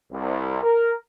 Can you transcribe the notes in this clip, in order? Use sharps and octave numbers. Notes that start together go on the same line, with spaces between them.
C2
A#4